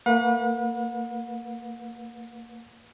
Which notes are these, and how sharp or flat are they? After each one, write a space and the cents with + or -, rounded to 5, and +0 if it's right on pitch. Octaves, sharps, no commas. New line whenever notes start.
A#3 -30 B4 -20 F#5 -45